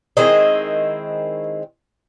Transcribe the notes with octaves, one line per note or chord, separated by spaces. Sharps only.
D#3 G#3 C4 E4 D#5